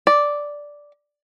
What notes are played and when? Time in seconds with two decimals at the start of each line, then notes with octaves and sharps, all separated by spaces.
0.07 D5